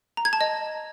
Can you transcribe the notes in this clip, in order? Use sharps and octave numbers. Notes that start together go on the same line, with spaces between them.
A#5
G#6
A5
D#5